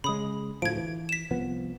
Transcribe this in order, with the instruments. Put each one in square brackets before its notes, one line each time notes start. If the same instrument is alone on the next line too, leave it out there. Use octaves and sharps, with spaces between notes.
[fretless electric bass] C#3 G#3 [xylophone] B5 D#6
[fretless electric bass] D2 A2 F3 [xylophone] G#6 D7
[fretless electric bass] E3
[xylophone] B6 E7
[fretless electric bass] C2 F3 B3